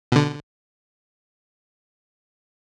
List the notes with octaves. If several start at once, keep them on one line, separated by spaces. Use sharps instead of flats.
B2 D3